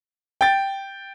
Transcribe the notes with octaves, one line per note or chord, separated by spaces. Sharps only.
G5 A6